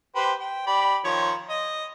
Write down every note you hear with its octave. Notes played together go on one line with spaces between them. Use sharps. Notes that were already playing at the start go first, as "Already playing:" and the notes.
G4 B4 C5
G5
G4 D5 B5
D#3 F3 C#5
D#5